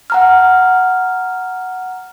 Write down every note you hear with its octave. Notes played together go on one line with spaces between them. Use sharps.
F#5 A#5 F6